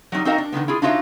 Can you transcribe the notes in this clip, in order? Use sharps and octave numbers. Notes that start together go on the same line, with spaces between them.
F#3 G3 C#4 D#4
C4 D#4 F#4 A#4 D#5 F5
D4
D3 D#3 F3 B3
E4 F4 G#4
D4 D#4 F4 F#4 C#5 E5